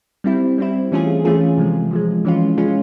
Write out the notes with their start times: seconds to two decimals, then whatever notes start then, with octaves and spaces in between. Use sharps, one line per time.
0.24 G3 C4 E4
0.58 G3 C4 E4
0.92 E3 A3 C#4 F4 G#4
1.25 E3 A3 C#4 F4 G#4
1.58 C3 F3 G#3
1.91 C3 F3 G#3
2.25 E3 G#3 C#4 F4
2.58 E3 G#3 C#4 F4